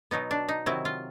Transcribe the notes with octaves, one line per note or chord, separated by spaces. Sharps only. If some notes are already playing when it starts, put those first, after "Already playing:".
B2 F#3 B3 D#4
D4
D#4
C3 D#3 F#3 E4
F4